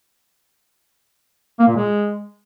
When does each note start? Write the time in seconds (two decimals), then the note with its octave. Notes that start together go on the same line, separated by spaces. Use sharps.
1.60 A#3
1.68 A#2
1.76 G#3